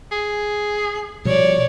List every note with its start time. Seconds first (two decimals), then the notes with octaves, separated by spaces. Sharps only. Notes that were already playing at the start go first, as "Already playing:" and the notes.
0.12 G#4
1.25 B2 F3 G3 C#5 D5